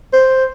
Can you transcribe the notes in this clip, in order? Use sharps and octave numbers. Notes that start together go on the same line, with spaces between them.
C5